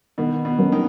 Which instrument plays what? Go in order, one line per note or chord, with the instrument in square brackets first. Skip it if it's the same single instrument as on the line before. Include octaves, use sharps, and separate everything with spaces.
[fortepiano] B2 [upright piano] D#3
[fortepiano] B2
[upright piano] F#3 A#3 C#4
[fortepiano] D#3